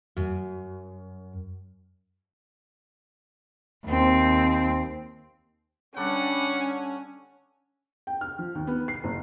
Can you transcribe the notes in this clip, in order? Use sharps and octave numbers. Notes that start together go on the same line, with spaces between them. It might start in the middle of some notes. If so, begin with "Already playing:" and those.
F#2
D#2 C4
D3 G3 C#4 D4 F#5
G5
F6
F3
D#2
B3
C7
F#1